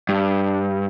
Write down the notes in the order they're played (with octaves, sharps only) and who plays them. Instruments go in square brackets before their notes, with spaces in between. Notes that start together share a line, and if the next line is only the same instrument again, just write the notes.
[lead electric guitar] G2